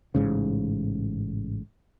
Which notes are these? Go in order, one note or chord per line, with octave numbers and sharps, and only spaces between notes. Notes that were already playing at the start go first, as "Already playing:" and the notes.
A1 G#2 C#3